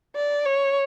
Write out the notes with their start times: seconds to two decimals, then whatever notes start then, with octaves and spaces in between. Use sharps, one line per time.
0.16 D5
0.46 C#5